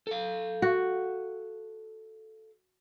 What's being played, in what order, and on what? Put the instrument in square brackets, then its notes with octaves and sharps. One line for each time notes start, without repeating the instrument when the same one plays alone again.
[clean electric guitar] A4 F5
[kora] F#4